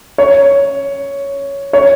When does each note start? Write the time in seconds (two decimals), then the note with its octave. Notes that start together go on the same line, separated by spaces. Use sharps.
0.18 C#5
1.73 C#5